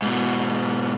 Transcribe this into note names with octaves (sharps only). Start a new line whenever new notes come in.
G#2 B2